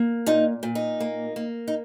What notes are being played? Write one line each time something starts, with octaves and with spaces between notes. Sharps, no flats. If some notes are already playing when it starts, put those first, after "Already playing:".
Already playing: A#3
A#2 D#4
A#2
D#4
A#3
A#3
D#4